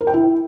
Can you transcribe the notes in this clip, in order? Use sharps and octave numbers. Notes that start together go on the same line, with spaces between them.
A#4
G5
E4